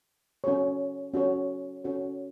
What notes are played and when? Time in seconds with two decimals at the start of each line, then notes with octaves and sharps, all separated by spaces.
0.44 C#4 F#4 A4 C#5
1.14 C#4 F#4 A4 C#5
1.84 C#4 F#4 A4 C#5